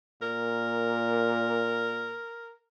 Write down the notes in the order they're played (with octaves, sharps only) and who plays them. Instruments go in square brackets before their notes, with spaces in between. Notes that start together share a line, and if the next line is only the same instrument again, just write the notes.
[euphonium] A#2 [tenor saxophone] A#4